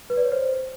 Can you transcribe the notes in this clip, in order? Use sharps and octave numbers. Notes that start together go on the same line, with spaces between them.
B4
D5
C#5
C5